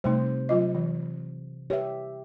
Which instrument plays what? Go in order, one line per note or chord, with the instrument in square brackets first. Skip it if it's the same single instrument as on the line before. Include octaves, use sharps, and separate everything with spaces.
[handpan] C3 C5 [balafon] G3 A3 D#4
[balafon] F#3 F4 D#5
E3
[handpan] G4 E5 [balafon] B4 C#5